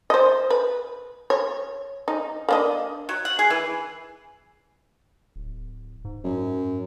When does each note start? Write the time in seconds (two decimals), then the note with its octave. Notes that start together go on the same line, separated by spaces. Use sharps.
0.10 C5 D#5
0.50 B4
1.30 C#5
2.08 D#4
2.49 A#3 D4 D#5
3.09 F#3
3.25 F#5
3.39 G#4
3.50 E3
5.36 D1
6.05 G#2
6.24 F#2